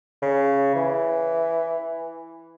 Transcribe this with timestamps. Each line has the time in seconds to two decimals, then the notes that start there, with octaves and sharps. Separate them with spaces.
0.22 C#3
0.75 E3